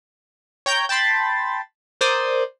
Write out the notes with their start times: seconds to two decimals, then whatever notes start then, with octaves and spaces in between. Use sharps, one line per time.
0.66 C#5 G5 A#5 G6
0.89 G5 A5 B5 C6 A6
2.01 A#4 C5 D5 D#6